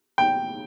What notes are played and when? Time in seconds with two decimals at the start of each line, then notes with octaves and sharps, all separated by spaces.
0.18 G5